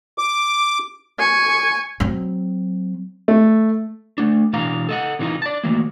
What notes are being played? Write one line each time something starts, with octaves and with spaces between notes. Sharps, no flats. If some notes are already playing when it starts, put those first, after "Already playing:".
D6
G#5 C#6
F#3 C4
A3
A3 D4
B2 E3 G#3 D4 F5 A#5
A4 D#5 F#5
C3 E3 G#3 C4 D#4 F4
D5 A5
D#3 E3 F#3 A3 A#3